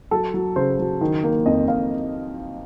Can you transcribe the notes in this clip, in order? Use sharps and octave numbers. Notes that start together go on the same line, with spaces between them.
F#3 A4
F#3
C#3 C5
F#3
D#3
A#3
F2 D#5
F2 F5